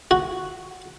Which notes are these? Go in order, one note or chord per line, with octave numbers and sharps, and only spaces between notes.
F#4